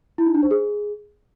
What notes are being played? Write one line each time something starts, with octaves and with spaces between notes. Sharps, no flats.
E4
D#4
D4
C5
G#4